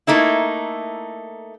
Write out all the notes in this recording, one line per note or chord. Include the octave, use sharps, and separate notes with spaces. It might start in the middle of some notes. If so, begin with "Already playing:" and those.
A3 A#3 D#4 E4